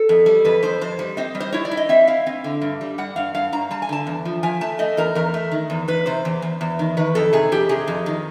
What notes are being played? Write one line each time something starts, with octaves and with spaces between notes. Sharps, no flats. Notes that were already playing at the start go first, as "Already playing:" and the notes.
Already playing: A4
F2
G3
F2 B4
F2 C5
F2 C5
G3
C4 D#5
G3
C5
E4 C#5
D5
E4
D#5
C4 E5
E4 F5
C4
D3
G2
G3
G3 F#5
G2 F5
G2 F5
G2 A#5
G3 A5
G#5
D3 A5
E2
F3
F3 G#5
A3 A5
A3 D#5
E2 A#4
E2 A#4
A3
D#3
E2
E2 B4
C3 C5
E2
E2
E2
D#3
D#3 B4
F2 A4
C3 G#4
F2 G4
C3 G#4
F2
D#3